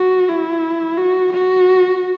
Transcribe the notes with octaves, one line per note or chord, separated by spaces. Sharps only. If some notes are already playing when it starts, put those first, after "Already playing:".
Already playing: F#4
E4
F#4
F#4